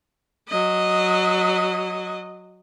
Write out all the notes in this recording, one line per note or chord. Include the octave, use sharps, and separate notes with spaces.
F#3 D#5